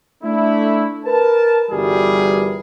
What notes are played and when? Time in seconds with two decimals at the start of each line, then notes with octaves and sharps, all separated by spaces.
0.23 A3 D4 E4
1.05 A#4 B4 A5
1.70 G1 E3 G3 F#4 G#4 A#4